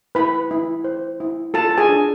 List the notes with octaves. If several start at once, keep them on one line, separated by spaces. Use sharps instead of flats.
E4 B4 B5
E4
C5
E4
F4 A4 A5
A5
G#4 G#5
D4